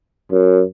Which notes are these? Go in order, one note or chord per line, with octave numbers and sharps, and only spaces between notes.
F#2